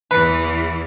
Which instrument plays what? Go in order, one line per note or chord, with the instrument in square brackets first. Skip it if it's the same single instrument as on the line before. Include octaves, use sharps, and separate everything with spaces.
[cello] E2 E3 [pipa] B4